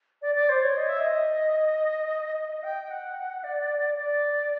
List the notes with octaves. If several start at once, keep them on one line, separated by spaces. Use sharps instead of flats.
D5
D5
C5
C#5
D#5
E5
D#5
D#5
G5
F#5
D5
D5